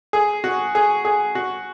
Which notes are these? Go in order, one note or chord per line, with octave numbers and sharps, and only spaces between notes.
G#4
F#4
G#4
G#4
F#4